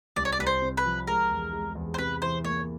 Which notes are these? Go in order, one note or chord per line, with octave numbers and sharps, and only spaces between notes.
C2 D5
C#5
D5
C2 B4
C5
C3
B4
F3
G#3 A#4
E2
G#3
E2
C5
C3 B4
E3 C5
A#3 C#5